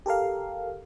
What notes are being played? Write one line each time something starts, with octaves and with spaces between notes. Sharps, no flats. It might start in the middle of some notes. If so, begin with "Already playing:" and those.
G4 A4 A#4 F5